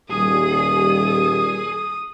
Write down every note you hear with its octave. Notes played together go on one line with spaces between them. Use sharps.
D#1 G3 G#4 D#6